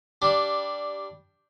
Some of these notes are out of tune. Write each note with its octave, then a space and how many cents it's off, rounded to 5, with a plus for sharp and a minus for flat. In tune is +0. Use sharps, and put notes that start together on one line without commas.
G3 +0 D4 -5